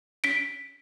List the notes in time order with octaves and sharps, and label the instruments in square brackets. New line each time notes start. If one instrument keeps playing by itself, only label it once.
[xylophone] B6 D7